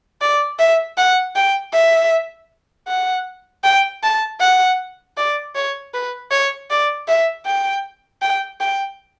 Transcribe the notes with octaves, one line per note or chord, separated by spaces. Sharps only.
D5
E5
F#5
G5
E5
F#5
G5
A5
F#5
D5
C#5
B4
C#5
D5
E5
G5
G5
G5